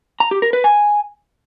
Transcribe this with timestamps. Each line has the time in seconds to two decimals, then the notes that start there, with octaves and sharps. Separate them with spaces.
0.20 A#5
0.31 G4
0.42 A#4
0.53 B4
0.64 G#5